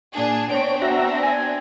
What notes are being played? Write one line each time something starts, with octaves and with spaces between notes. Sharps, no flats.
A#2 D4 G#4
B3 C4 D4 C#5 D7
F#4 E5 A#5
G#5